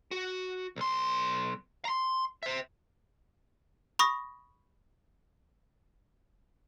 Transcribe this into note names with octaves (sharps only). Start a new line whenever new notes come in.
F#4
B1 C6
A#5 C6
C5 E5
B5 C#6 D#6 A#6